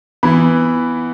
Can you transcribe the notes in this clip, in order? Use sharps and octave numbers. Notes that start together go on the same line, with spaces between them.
E3 B3 E4 B5